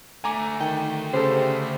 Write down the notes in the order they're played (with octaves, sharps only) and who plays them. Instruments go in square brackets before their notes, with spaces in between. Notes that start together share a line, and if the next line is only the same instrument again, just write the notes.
[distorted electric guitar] D3 A3 [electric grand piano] G#5 A#5 D6
[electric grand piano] D#3 [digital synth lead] G5
[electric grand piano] C#3 G4 A4 [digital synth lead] C5